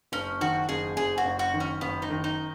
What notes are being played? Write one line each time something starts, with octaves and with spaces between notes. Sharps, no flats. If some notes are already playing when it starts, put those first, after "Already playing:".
F#1 C#4
D#3 F#4
F#1 G#4
F#1 G#4
F#4
F#1
F#4
D#3
C#4
F#1 B3
D#4
D#3
D#4